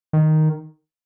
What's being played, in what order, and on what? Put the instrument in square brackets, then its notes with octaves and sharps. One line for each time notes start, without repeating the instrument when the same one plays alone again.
[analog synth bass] D#3